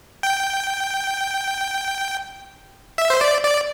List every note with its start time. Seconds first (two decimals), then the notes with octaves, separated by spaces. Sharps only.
0.23 G5
2.98 E5
3.10 C5
3.21 D5
3.44 D5